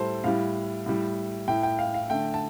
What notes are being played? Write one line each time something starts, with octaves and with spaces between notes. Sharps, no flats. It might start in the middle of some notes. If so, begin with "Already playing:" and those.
Already playing: A2 G3 A4 C5
A2 G3 F5
A2 G3
A2 A3 G5
G5
F5
F5
D3 A3 G5
A5